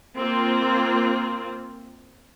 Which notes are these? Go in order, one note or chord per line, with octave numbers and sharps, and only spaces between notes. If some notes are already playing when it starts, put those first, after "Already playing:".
A#3 C4 F4